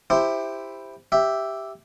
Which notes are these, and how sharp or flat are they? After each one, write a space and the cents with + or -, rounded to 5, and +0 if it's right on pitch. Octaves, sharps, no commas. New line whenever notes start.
E4 +0 G4 +15 C5 +0
G4 +0 E5 +0